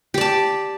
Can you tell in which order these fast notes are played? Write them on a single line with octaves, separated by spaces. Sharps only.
G4 D5 A5